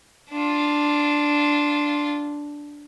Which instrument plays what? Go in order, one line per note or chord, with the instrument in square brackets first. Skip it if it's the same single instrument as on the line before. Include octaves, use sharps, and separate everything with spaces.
[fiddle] D4 F4